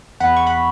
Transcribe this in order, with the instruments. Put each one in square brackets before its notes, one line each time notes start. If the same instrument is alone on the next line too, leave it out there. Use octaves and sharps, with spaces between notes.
[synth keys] E2 F#5 B5
C#6
F#5 B5